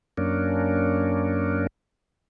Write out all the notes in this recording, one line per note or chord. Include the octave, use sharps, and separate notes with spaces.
F#2 A#3 C#4 D4